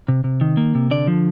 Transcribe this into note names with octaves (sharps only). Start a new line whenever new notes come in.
C3
C3
D#3
A#3
C3
D3 D5
F3